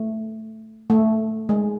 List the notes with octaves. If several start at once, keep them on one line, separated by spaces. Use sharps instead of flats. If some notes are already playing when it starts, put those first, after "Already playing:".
Already playing: A3
A3
G#3